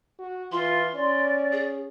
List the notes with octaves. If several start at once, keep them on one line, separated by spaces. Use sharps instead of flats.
F#4
E3 F4 C6
C#4 D5
G#4